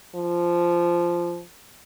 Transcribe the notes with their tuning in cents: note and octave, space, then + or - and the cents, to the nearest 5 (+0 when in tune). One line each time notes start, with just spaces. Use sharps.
F3 -10